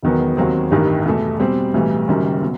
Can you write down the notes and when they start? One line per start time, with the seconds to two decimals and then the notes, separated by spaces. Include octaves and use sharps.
0.03 E1 E2 D#3 F#3 B3
0.37 D#2 D#3 F#3 C4
0.71 A1 G2 D#3 G3 D#4
1.05 E2 B2 A3
1.40 B2 G3 C4
1.74 B1 A2 E3 G3
2.07 F#1 F#2 D#3 G3
2.42 B2 F#3